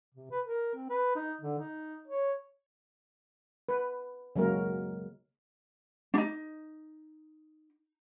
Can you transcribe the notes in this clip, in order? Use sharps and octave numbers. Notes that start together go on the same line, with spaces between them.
C3
B4
A#4
C4
B4
D#4
D3
D#4
C#5
B4
C#3 F#3 G#3 A#3 A#4
D4 D#4